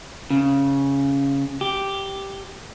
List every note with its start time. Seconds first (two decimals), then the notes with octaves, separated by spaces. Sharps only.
0.30 C#3
1.61 G4